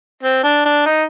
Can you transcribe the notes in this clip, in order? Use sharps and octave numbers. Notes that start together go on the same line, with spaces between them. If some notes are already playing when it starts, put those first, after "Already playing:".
C4
D4
D4
D#4